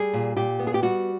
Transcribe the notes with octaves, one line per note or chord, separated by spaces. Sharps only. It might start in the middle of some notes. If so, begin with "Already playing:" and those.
Already playing: G3 G#4
A#2
A#2 G4
B3
G#4
G4
G3 F#4